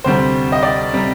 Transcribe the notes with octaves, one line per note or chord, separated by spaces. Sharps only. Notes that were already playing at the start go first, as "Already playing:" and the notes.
D2 C3 G3 C5
D#5
D5
C3 G3